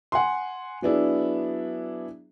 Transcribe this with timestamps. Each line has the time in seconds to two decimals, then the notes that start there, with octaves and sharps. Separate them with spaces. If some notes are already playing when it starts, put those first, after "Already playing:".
0.12 F#5 G#5 C6
0.82 F#3 B3 D4 E4 G#4